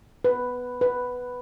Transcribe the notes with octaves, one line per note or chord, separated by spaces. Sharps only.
B4
B4